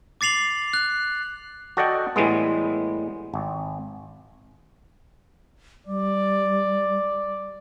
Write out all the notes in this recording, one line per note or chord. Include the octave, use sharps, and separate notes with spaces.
D6 A6 C7 F7 F#7
F#6
F#4 A4 D5 D#5 F#5 G5
A2 E3 G3 G#3 B3
G#1
G3 D5